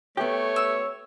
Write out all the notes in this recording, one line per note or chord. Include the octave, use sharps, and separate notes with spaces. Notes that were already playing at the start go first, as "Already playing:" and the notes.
A3 B3 G4 C#5
E6